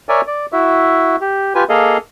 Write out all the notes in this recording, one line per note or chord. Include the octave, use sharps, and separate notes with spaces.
A#4 C#5 D5 E5 G#5
D5
E4 F#4 E5
G4
F4 G4 B4 G#5
A#3 G#4 A4 D#5 F5